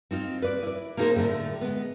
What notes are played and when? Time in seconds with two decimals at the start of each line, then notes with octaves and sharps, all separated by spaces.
0.11 C4 D#4 F4
0.42 B4 D5
0.63 E4 D5
0.97 A#3 B3 D#4 G#4 A#4 C5
1.15 A2 D3 G3 A3 D4
1.61 G#3 B3